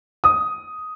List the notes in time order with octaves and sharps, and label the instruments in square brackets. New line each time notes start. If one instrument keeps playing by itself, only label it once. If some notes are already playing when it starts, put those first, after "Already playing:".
[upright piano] D#6